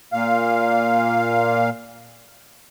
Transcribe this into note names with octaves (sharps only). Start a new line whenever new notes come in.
A#2 F5